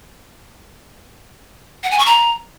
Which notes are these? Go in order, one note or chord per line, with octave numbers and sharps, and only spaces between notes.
F#5
G#5
C#6
A#5